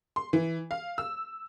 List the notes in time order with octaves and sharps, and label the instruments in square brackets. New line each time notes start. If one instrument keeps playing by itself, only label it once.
[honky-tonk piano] C6
E3
F5
E6